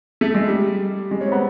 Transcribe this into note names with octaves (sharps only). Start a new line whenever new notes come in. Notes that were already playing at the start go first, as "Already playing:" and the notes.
A3
G#3
G3
G#3
C#4
C4
B3